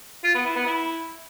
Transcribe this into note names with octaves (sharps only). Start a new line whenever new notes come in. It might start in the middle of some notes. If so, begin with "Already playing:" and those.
F4
B3
E4
B3
E4